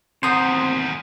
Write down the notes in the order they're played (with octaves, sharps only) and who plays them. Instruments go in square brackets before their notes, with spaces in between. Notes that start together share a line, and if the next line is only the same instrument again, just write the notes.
[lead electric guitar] E2 D#3 [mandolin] B3 D#6 G6 [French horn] C4 [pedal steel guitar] C5